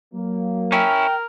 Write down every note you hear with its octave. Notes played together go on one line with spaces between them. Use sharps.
F#3 A#3
C#4 E4 A#4 G5